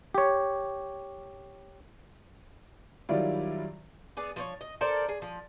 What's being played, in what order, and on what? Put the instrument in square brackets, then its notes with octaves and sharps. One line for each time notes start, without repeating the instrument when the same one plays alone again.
[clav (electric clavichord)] G4 C#5
[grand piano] D#3 F#3 G3 E4 F4 D5
[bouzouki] B3 G#4 D5
F3 C5 C#5
D#5
A4 A#4 C5 D5
G#4
F3